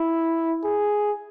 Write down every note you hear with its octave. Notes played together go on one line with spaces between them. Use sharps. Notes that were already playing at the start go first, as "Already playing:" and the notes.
Already playing: E4
G#4